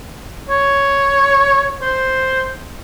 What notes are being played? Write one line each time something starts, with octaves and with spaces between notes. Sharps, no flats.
C#5
C5